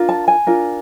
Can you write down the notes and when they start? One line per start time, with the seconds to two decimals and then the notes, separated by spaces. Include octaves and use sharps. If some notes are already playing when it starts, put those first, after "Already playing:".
Already playing: D4 F4 A#4
0.09 A5
0.28 G#5
0.47 D4 F4 A#4